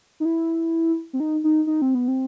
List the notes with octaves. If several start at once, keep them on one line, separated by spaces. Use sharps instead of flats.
D#4
E4
C4
D#4
D#4
D#4
C4
B3
C4